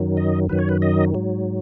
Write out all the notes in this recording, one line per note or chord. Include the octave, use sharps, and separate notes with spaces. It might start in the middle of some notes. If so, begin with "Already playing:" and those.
Already playing: F#2 D#3 F#3
D#5
F#2 D#3 F#3 B4
C#5
B4
D#5
G#2 F#3